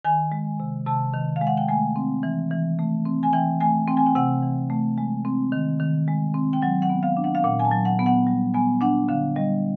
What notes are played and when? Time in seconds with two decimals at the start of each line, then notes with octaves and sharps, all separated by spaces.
0.04 D#3 G#5
0.32 G#3
0.60 C3
0.86 C3 A5
1.14 D#3
1.36 F5
1.41 G#3
1.47 F#5
1.57 G5
1.68 A3 G#5
1.96 C4
2.23 E3
2.51 E3
2.79 A3
3.06 C4
3.23 G#5
3.33 E3 G5
3.60 A3 G#5
3.88 C4 G5
3.97 G#5
4.06 G5
4.15 C3 F#5
4.42 E3
4.70 A3
4.98 G#3
5.25 C4
5.52 D#3
5.80 D#3
6.08 G#3
6.34 C4
6.53 G5
6.62 F#3 F#5
6.82 F#5
6.89 B3
7.03 F5
7.17 D4
7.24 F#5
7.35 F5
7.44 A#2 F#5
7.59 G#5
7.65 A5
7.72 F#3
7.85 F#5
7.99 B3
8.06 F#5
8.27 G3
8.54 B3 G#5
8.81 D4 F#5
9.09 D3 F5
9.36 G3 D#5